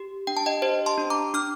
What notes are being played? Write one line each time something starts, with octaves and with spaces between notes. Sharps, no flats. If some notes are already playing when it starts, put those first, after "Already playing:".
Already playing: G4
D4 G5
A5
D#5 G5
G4 C5 D#5
A5 C6
D4
A#5 D6
D4 D6 F6